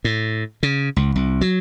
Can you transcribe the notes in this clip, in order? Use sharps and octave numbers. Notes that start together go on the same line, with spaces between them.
A2
C#3
C#2
C2
F#3